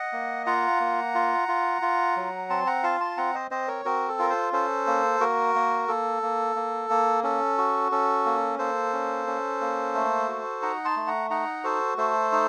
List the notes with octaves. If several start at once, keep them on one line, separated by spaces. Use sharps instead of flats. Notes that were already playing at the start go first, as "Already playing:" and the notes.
Already playing: D#5 F#5
A#3
F4 F#5 A#5
A#3
F4
F4
F4
F#3
C4 A5 C6
F#5 A#5
F4 F5 A5
A5 C6
C4 F#5 A#5
C5 D#5
C4 C5 D#5
A#4 C#5
C4 F#4 A#4
A4
F4 A#4
A4 C5
C#4 A4 C5
A#3
A#3 F#4 A#4
A#3
A#3 A4
A#3
A#3
A#3
C#4 A4
F#4
C#4 A4
A#3
A#3 A4 C5
C#4
C#4
A#3
A3
F#4
D#4 F#5 A#5
A5 C6
A3
F#5 A#5
D#4 F#5 A#5
F#4 A4 C5
A3 A4 C5
D#4